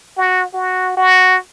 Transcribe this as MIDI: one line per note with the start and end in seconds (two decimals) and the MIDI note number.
0.18 0.44 66
0.54 0.95 66
0.97 1.38 66